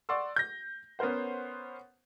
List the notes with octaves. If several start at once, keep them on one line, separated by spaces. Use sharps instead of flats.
D5 F#5 C6 C#6 E6
G6 A#6
B3 C#4 A#4 C5 F#5